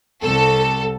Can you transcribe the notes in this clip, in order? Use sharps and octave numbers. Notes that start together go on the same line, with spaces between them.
C2 A4